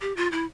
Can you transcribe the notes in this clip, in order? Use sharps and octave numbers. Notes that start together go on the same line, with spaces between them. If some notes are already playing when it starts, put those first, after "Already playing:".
G4
F4
E4